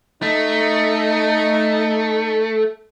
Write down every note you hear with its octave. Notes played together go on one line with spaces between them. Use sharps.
A3 D#4